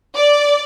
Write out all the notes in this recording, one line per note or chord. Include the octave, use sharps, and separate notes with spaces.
D5